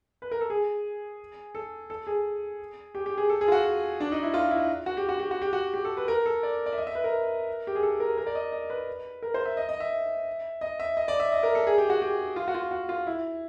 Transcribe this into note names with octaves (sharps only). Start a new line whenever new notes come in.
B4
A#4
A4
G#4
A4
A4
G#4
G4
G4
G#4
A4
G#4
F4
F#4
D4
D#4
E4
F4
E4
F#4
G4
F#4
G4
F#4
G4
F#4
G4
A4
B4
A#4
A4
D5
D5
E5
D#5
E5
B4
A#4
G4
G#4
A4
A#4
A#4
D5
D#5
D#5
B4
A#4
C5
E5
D#5
D#5
E5
D#5
E5
D#5
D5
E5
D#5
A#4
A4
G#4
G4
F#4
G4
F4
F#4
F4
F#4
F4
E4